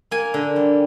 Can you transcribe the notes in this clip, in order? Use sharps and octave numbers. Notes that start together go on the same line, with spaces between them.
A#3 G#5
D3
G3